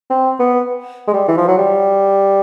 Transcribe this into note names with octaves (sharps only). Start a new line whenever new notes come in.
C4
B3
G#3
G3
E3
F3
F#3
G3